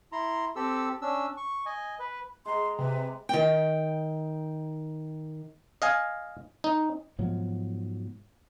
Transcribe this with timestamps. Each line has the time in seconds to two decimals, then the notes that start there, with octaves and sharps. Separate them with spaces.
0.12 E4 A#5 C6
0.56 C4 G4 A4 E6
1.02 C#4 D4 E6
1.37 C#6
1.66 D#5 G#5
1.99 B4
2.46 G#3 A#5 C6
2.79 C3 B4
3.29 D#3 G5
5.82 D#5 F5 G#5
6.64 D#4
7.19 G#2 B2 F3 F#3